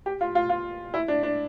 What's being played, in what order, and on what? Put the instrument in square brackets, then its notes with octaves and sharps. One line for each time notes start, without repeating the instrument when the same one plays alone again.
[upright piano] G4
F4
F4
F4
E4
D4
D4